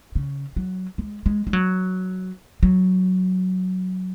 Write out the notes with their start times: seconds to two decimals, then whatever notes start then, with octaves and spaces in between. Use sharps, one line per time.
0.15 C#3
0.56 F#3
0.98 G#3
1.26 G#3
1.47 G#3
1.53 F#3
2.63 F#3